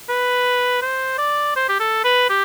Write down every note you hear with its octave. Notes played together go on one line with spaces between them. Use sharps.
B4
C5
D5
C5
G4
A4
B4
G4